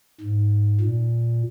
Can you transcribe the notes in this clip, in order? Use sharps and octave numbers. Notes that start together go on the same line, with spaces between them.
G#2
A#2